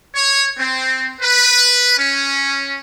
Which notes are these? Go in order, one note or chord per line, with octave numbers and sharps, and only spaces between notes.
C#5
C4
B4
C#4